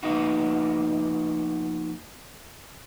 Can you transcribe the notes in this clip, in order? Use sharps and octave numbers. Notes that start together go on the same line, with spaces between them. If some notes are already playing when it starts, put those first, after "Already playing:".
F3 A#3 B3 D#4 F#4